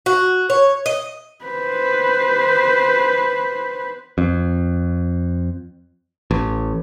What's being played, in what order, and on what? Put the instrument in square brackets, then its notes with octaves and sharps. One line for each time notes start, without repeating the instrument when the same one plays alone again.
[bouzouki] F#4
C#5
D#5
[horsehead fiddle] B4 C5
[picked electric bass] F2
A1